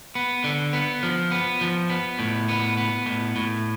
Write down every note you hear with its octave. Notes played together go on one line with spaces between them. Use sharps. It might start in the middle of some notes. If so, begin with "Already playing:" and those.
B3
D3
B3
F3
B3
F3
B3
A2
B3
B3
A2
A2